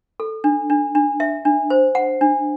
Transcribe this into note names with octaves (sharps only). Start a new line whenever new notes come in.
A4
D4
D4
D4
E5
D4
C5
F#5
D4